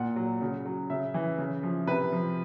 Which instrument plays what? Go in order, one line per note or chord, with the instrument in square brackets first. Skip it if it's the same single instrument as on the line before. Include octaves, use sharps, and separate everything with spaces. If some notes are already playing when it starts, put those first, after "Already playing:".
Already playing: [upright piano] A#2 F#5
F#3
C#3
F#3
C#3 E5
E3
C#3
F3
C3 B4
F3